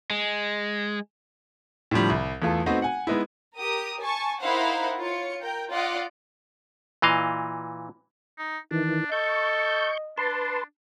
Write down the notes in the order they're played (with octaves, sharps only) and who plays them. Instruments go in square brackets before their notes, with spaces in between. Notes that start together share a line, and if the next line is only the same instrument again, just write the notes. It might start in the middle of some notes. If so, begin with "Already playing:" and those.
[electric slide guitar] G#3
[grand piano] A2 D3 F3 G3
C2
E2 A3 F4 A4
A3 B3 C4 D#4 F#4
F#5 G#5
G#3 B3 D#4 E4
[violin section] G4 A#4 D#6
G#5 A5 C#6
D#4 E4 A#4 C5 F5 F#5
F4 C#5 C#7
A#4 G5
F4 D5 D#5 F#5
[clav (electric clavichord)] A#2 E3 D#5 F5
[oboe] D#4
[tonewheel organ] D#3 E3 [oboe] D4
[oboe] A4 [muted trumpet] D#5 [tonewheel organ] C#6 G6
[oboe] D4 [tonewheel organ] B4 A5 C6